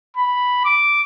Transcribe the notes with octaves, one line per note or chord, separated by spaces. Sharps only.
B5
D6